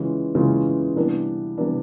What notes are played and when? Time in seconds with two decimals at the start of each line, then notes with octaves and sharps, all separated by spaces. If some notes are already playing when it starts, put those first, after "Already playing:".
Already playing: C#3 E3 G#3 C#4 F4
0.35 C#3 E3 G#3 C#4 F4
0.96 C3 E3 G3 B3 D4
1.58 C3 E3 G3 B3 D4